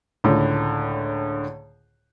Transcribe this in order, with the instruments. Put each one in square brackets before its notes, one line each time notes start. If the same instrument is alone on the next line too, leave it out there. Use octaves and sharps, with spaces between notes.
[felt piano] C#2 A2 D3